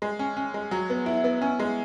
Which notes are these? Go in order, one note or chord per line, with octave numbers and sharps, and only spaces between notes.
G#3
C#4
C#4
G#3
F#3
B3
E4
B3
C#4
G#3